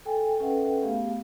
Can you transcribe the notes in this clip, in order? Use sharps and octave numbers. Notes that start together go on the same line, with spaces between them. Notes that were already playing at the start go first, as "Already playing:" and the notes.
A4 G5 G#5
C#4 A4 B4 E5 F#5 G5
A3 B3 G4 G#4 F5